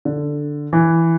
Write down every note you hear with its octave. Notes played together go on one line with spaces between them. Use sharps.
D3
E3